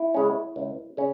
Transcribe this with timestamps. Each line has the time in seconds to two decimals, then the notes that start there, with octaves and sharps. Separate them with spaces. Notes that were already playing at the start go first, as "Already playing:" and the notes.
Already playing: E4
0.14 C#3 G#3 C#4
0.56 C#2
0.97 C#3 C#4